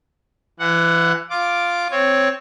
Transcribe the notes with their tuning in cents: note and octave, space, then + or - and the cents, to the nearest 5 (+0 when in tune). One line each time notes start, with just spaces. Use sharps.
E3 +30 F#5 +0
F4 +0 D6 +0
C4 +0 C#5 +0